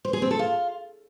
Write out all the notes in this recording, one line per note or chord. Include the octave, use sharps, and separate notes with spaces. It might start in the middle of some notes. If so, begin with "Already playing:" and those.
C5
G#4
C4
A4
F4